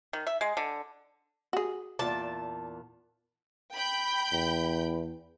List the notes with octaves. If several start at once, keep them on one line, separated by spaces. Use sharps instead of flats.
D#3
E5
G#3
D3
F#4 G#4
E2 A#2 A5 D6
G5 B5 G6
E2